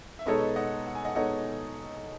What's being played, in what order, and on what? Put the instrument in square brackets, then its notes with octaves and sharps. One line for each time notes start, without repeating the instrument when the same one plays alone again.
[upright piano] E5
[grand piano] B2 G#3 D#4 A4 C#5 [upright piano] B4 D#5
[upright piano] D#5 F#5
F#5
G#5
D#5 F#5
[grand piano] B2 G#3 D#4 A4 C#5 [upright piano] D#5 F#5